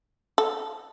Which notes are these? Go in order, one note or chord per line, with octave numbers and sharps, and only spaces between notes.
A4